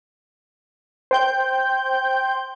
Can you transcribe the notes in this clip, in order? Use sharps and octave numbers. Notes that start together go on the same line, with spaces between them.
C5 G5 G6